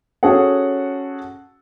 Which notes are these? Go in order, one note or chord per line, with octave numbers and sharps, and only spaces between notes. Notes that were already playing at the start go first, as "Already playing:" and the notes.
C#4 F#4 G#4 A4 F#5